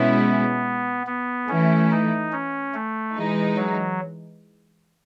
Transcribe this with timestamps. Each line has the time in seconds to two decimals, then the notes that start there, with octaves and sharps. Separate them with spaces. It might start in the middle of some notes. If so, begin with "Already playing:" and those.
Already playing: B2 G#3 B3 C#4 E4
1.07 B3
1.48 E3 A3 C#4 E4
1.91 D#4
2.32 C#4
2.74 A3
3.16 E3 G#3 D#4
3.57 F#3